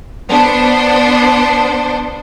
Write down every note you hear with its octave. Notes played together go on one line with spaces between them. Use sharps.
B3 D4 C5